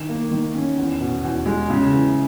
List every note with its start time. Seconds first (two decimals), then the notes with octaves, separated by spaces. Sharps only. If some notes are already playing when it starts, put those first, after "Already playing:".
Already playing: D#3
0.09 A#3
0.31 D#3
0.55 C#4
0.78 E2
1.01 B2
1.23 E2
1.46 G#3
1.70 C#3
1.92 E3